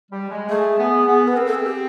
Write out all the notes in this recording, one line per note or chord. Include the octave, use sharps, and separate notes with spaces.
G3
G#3
A3 G#4
B3
B3
B4
C4 A#4
A4
G#4
G4